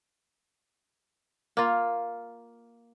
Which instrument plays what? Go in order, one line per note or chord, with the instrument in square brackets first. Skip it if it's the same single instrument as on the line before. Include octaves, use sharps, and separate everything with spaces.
[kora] A#3 F4